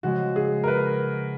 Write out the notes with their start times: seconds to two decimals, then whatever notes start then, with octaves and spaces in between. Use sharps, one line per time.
0.03 C#3 F3 G#3 F#4
0.36 G#4
0.64 A#4
0.68 B4